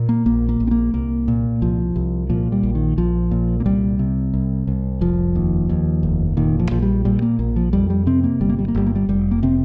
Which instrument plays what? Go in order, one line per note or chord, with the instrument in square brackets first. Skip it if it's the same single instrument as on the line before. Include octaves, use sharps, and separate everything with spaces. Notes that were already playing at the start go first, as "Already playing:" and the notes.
Already playing: [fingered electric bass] A#2
A#3
A#1 A#3
A#3
A#1
C4
A#3
C2 A#3
A#2
C2 F3
C2
A#2 F3
G3
A#1
D#3
A#1 F3
A#2
A#3
C2 G3
C3
C2
C2
F1 F3
D#2
D#2
F1
A#2 D#3
F3
A#1 F3
G3
A#2 G3
A#3
A#1 A#3
F3
F2 G3
G3
C3 C4
A#3
G1 G3
A#3
G3
A#3
G1 G3
A#3
G3
F1 G3
A#3
C3 C4